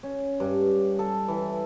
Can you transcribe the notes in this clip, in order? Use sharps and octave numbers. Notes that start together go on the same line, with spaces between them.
C#4
G2
A4
E3